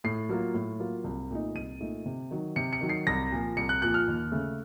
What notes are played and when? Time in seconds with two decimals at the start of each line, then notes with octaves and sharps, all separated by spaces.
0.04 A2 C7
0.29 F#3 A#3 F4
0.54 A2
0.80 F#3 A#3 F4
1.04 C2
1.31 A#2 A3 D#4
1.55 C2 D#7
1.80 A#2 A3 D#4
2.06 C3
2.31 D#3 F#3
2.56 C3 C#7
2.73 C#7
2.81 D#3 F#3
2.89 C7
3.07 C2 A#6
3.32 A#2 F3
3.57 C2 C#7
3.69 F#6
3.82 A#2 F3 F#6
3.94 F6
4.08 D#2
4.32 C#3 A3